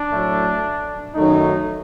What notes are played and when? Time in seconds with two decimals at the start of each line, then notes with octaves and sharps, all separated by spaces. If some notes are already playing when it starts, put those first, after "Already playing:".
Already playing: D4
0.10 A2 F#3 A3
1.15 F#2 D#3 F#3 A3 D#4